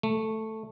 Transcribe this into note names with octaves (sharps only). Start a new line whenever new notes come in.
A3